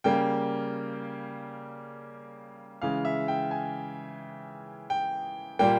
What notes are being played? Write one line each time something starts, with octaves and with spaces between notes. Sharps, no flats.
C#3 G3 A#3 G5
C#3 E3 G#3 F5
E5
G5
G#5
G5
A#2 G3 A#3 G5